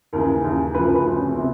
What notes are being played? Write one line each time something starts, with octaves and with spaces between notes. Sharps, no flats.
D#2 C#3 E3 A#4
D#2 C#3 E3
D2 C#3 F3 B4
A#4
B4
D2 C#3 F3 F4
C#4
C4
C3 B3